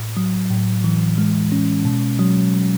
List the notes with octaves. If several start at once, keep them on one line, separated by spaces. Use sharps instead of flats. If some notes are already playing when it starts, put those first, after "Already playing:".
Already playing: A2
F#3
A2
E3
G#3
C#4
B2
F#3